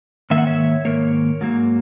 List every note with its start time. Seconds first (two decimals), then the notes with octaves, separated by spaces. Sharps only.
0.30 G#2 D#3 A#3 E5
0.38 F#5
0.47 C#5 E5
0.85 G#2 D#3 A#3 A#4 C#5
1.41 G#2 F#3 A#3